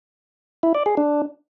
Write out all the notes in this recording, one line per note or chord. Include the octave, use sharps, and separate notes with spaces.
E4
D5
G#4
D4